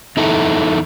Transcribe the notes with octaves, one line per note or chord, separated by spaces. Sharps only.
E2 D#4 E4 A4